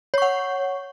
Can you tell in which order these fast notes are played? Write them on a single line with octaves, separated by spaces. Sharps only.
C#5 C#6 F#5